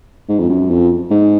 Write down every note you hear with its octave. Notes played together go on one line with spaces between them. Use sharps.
G#2
F2
F#2
F2
G#2